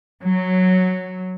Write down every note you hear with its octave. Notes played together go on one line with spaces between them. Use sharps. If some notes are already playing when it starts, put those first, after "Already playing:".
F#3